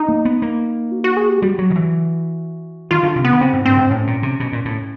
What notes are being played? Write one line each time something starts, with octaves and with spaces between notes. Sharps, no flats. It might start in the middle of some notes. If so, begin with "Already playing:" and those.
Already playing: D#4
A#3
B3
A#3
F#4
F#4
G#4
G4
G3 F#4
F#3
D#3
E3
D#3 F4
D3
C3
B3
D3
C#3 C4
G#2
G2 C4
G#2
A2 C#4
A#2
C3
B2
A#2
A2